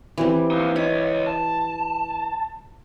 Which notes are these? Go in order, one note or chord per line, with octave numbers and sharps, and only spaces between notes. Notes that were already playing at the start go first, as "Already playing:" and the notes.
E3 G3 C4
A#3 D#4
C#5 D#5 B5
A5